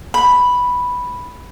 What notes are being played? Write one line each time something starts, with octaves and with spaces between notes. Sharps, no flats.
B5